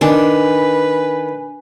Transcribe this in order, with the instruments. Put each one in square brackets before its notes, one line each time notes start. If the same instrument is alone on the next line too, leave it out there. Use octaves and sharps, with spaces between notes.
[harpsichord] D#3 [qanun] D4 [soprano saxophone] B4 [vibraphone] G#5